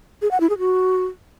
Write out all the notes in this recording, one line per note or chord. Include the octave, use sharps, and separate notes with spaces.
G#4
F#5
E4
G#4
F#4